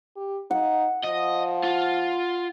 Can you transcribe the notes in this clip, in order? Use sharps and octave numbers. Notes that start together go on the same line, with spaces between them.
G4
D#4 F#5
F3 D#5
F4